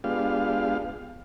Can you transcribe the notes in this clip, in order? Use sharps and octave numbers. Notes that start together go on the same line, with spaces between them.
G#3 B3 D4 F4 G4 F5